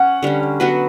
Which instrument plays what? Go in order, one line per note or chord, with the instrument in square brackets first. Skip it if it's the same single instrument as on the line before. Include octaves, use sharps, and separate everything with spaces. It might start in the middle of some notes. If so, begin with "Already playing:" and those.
Already playing: [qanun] C#4 [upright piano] F#5
[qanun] D3 G3 C#4
F#3 B3 F#4 B4